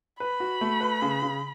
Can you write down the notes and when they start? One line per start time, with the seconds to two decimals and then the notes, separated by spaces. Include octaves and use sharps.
0.20 B4 B5
0.40 F#4
0.61 A3
0.81 B4
1.02 C#3
1.22 C#3